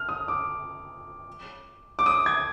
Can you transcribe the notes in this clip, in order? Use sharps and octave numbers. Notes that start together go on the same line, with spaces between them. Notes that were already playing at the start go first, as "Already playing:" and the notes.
Already playing: F6
D#6
D6
D6
D#6
G#6